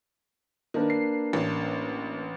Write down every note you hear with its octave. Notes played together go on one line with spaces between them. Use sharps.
D#3 A#3 D4 B4
C7
A1